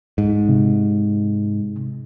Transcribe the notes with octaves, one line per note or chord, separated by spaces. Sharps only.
G#2
C3